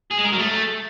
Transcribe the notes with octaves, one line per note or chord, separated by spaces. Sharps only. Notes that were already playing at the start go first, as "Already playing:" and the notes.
G#4
G#3
A#4
F#3
A3